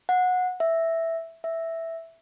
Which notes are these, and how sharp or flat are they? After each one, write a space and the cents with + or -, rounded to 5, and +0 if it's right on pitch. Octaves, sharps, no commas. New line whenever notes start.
F#5 -20
E5 +0
E5 +0